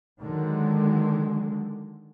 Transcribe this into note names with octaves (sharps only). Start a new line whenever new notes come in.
D3 D#3 F#3 G#3